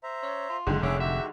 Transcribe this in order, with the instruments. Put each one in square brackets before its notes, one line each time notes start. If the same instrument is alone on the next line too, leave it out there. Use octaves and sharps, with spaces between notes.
[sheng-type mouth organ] C5 E5 A#5
[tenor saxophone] C#4
F4
[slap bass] F#1 [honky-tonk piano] D3 D#3 G#3
[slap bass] F1 [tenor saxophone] C#4 [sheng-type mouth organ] G#4 E5 D6
[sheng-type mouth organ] F#4 G4 [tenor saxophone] E5